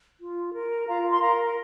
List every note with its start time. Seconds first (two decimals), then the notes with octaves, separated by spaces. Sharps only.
0.20 F4
0.54 A#4
0.88 F4 F5 A#5
1.11 C6
1.21 A#4 F5 A#5